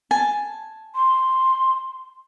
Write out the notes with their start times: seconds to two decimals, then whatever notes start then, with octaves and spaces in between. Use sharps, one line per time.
0.11 G#5 A5
0.95 C6